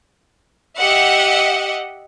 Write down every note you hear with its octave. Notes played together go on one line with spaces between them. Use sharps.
G4 D#5 E5 F#5